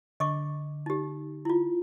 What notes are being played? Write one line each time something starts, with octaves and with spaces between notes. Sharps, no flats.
D3 D#5 C#6 D6
D#4 G4
E4 F4